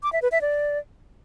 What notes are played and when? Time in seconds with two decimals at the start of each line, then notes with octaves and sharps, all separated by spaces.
0.03 D6
0.13 E5
0.22 B4
0.32 E5
0.41 D5